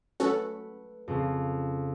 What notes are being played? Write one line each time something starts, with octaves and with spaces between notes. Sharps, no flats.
A3 C#4 F#4 A4 B4 F#5
F2 C#3